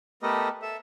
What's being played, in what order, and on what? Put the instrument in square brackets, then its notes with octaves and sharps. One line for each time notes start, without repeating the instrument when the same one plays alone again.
[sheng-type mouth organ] A3 B3 G4 A4 A#4 D#5
A4 E5